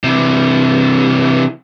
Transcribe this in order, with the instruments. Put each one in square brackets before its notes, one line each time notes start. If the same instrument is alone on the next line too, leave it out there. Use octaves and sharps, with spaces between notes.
[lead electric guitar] C3 E3